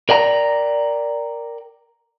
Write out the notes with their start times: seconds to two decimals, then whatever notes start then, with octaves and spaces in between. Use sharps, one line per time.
0.09 A#4 D5 G5 A#5